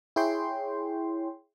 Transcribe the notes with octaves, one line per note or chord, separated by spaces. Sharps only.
E4 G#4 C#5 G5 C6